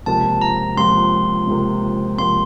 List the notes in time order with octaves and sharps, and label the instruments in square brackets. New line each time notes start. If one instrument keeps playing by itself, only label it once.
[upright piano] C#2 C3 F3 A#3 [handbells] A5
[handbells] A#5
[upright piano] C#2 C3 F3 A#3 [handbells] C6
[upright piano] C#2 C3 F3 A#3
[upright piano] C#2 C3 F3 A#3 [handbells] C6